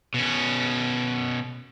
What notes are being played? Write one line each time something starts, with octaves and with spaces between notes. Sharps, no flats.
B2 C#4